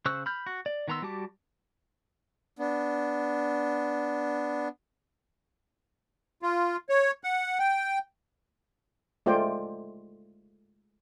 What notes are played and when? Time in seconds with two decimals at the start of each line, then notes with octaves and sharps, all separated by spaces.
0.06 C#3 C5 C#6 E6 F#6
0.26 B5 F6 G6
0.47 F#4
0.66 D5
0.88 D#3 B3 A#5 C6 E6
1.02 G3 F#4 G4 A5 D6
2.59 B3 D4
6.42 F4
6.89 C#5
7.24 F#5
7.59 G5
9.26 G#3 A3 F4 C5 D5 G5